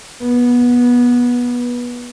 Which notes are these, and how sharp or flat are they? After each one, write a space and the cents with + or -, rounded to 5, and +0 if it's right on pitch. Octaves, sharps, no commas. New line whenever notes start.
B3 -20